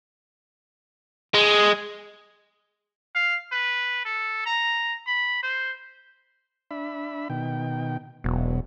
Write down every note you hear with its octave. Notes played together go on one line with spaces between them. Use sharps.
G#3
F5
B4
A4
A#5
B5
C5
D4 E5 B5
B2 D#3 G5
E1 B2 F#3